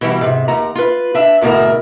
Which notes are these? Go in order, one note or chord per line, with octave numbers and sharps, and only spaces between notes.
B2 E3 G3
G#2 C3
D#2 A#5
F4 B4
D4 E5
D2 G#2 B2 A#3 E4 A#4